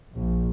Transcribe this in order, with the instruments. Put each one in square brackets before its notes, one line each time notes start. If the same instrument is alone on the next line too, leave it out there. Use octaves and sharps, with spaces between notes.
[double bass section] A#1